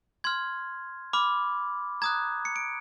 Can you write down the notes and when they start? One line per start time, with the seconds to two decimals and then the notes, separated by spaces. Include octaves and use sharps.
0.24 C6 F6 G#6
1.13 B5 D6 F6
2.02 A#5 D#6 F#6 G#6
2.45 C#7
2.56 D7